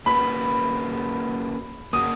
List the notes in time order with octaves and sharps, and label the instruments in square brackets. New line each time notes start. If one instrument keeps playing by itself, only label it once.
[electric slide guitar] A#3 C#4 F#4 B4 [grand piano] B5
[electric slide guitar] A#3 C#4 F#4 [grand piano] D#6